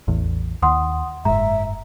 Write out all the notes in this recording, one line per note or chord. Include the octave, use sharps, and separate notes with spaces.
A1 E2
D#2 F#5 C6 D#6
F#1 G#2 E5 A#5